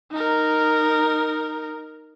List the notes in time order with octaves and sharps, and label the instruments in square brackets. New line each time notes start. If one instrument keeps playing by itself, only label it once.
[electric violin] D#4 A#4